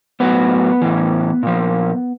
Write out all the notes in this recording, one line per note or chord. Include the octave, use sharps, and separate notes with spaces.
A2 F#3 B3 B4
A2 E3
A#2 F3